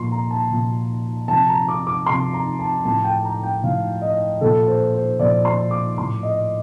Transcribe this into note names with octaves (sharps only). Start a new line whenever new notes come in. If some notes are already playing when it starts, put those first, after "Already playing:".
Already playing: A#2 F3 C6
A#5
A5
A#2 F3
C3 F3 A5
A#5
D6
D6
C3 F3 C6
A#5
A5
A2 F3 A5
G5
A#5
G5
A2 F3 F5
D#5
A#2 F3 A4
C5
C5
A#2 F3 D5
C6
D6
A2 F3 C6
D#5